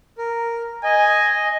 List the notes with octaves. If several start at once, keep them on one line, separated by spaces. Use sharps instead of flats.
A#4
D#5 G#5